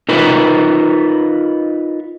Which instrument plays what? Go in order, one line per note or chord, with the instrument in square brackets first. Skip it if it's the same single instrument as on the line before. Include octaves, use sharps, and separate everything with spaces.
[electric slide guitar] D#4 F4 A#4 B4